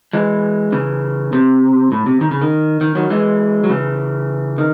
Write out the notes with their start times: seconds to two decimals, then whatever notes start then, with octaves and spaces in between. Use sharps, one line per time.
0.13 E3 G#3
0.72 C#3 E3
1.33 C3
1.92 A2
2.06 C3
2.21 D#3
2.31 C#3
2.41 D#3
2.81 D#3
2.95 D#3 F#3
3.10 E3 G#3
3.64 F#3
3.70 C#3 E3
4.58 D#3